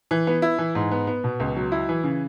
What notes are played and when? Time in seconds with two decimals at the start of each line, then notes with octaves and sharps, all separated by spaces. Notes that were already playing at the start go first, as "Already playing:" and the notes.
0.11 E3
0.27 B3
0.42 E4
0.58 E3
0.75 G#2
0.91 B3
1.07 B3
1.24 B2
1.40 C#2
1.56 F#3
1.72 E4
1.89 E3
2.04 C#3